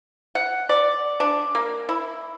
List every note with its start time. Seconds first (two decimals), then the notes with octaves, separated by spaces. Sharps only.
0.35 F#5
0.69 D5
1.20 D4
1.55 A#3
1.89 E4